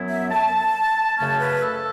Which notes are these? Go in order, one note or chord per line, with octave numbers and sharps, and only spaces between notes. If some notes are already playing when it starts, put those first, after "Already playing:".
Already playing: F#2 F#3 B3 E4
E5
A5
F#2 C#3 A3 C#4 A5
B4
A4